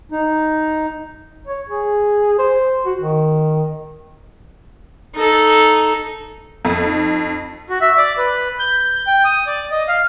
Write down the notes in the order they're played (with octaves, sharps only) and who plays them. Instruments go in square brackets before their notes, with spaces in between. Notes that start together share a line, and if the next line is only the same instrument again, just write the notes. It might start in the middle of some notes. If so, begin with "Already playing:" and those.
[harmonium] D#4
[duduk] C#5
G#4
C5
F#4
D#3
[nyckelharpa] D#4 A4
[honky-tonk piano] F2
[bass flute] D#4
[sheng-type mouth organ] F#4
E5
D5
B4
G6
G5
D#6
D5
D#5
F5